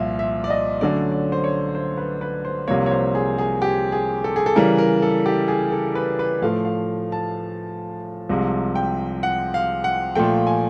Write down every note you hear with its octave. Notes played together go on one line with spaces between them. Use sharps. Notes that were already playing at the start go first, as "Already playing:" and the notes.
Already playing: C2 A#2 F3 E5 F5
E5
D5
D#5
D3 F#3 A3 C#4 D5
D5
C5
C#5
C5
B4
B4
C5
C2 C3 F3 A#3 C#5
C#5
C5
G#4
G#4
G4
G#4
A4
G#4
A4
C#3 E3 G3 A#4
A#4
A4
G4
G#4
A4
B4
B4
A2 F3 A3 F5
F5
A5
C2 C3 F3 G#3
G5
F#5
F5
F#5
A#2 F3 A3 G5
G#5